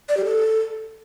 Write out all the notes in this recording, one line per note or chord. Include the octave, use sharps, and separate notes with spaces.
D5
G4
A4